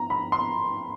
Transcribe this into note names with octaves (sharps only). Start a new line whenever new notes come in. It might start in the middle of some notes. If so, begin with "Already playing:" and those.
Already playing: A#5
B5
C6